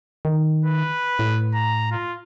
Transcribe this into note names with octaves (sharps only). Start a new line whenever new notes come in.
D#3
B4
A2
A#5
F4